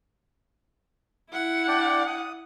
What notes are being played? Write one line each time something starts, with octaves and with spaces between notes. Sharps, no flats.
E4 F#5
D4 D5 G5
D#6